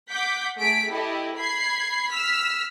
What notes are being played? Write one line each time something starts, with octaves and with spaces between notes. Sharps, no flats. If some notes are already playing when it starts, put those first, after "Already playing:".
F#5 D6 G6 B6
A3 G#4 B6 D7
E4 G4 A4 D#5
B5 G#6 C7
E6 F6 B6